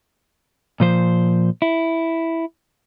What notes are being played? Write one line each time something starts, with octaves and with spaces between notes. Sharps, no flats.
A#2 F3 C5
E4